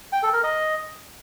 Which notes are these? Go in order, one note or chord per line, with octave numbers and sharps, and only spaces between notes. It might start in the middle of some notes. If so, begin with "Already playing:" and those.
G5
A4
A#4
D#5